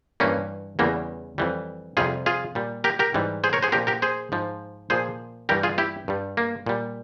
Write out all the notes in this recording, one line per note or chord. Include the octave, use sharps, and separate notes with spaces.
G2 E3 G3 A#3 C#4
E2 C#3 E3 G3 A#3
F2 E3 G3
F2 C3 G3 F4 G#4
F4 G#4
A#2 G3
G4 A#4
G4 A#4
G#2 E3 G3
G#4 C5
A#4 C#5
G#4 C5
A#2 F3 G4 A#4
G4 A#4
G#4 C5
G#2 F3
A#2 F3 G#4 C5
G2 E3 G3 G4 A#4
F4 G#4
E4 G4
G2 G3
A#3
A#2 G3